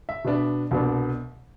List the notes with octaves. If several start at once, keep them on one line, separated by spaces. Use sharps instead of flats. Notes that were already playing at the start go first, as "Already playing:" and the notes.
E5
B2 B3 D4
C2 B2 B3 D4